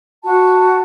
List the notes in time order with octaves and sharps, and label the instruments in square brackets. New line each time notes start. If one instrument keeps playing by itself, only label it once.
[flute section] F#4 A5